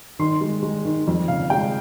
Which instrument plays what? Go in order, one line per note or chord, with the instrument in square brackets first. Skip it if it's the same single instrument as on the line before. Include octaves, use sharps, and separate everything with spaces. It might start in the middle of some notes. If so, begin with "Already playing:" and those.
[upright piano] D#3 C6
G#3
G#3
D#3
F2
C#3 F5
G#3 G5